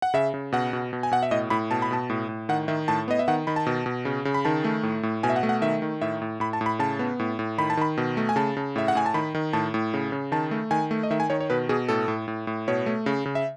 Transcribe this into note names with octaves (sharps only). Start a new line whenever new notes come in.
F#5
C#3 E5
C#3
B2 F#5
B2
B2
G#5
B2 F#5
E5
A2 D#5
A2 B5
B2 A5
B5
B2 A5
A2
A2
D#3 F#5
D#3 E5
A2 A5
B3 D#5
E5
D#3 F#5
D#3 B5
A5
B2
B2
C#3
C#3
B5
D#3 A5
A3
A2
A2
B2 G#5
E5
F#5
A3
F#5
D#3 E5
D#3
A2 E5
A2
A2 B5
A5
A2
B5
C#3 A5
B3
A2
A2
D#3 B5
A5
D#3 B5
B2
A3
G#5
C#3 A5
C#3
A2 E5
F#5
A2 G#5
A5
D#3 B5
D#3
A2 A5
A2
C#3
C#3
D#3 A5
A3
D#3 G#5
A3
D#5
D#3 E5
G#5
D#3 C#5
C#5
B2 B4
B2 G#4
A2 A4
A2
A2
A2
B2 C#5
A3
C#3
C#3
E5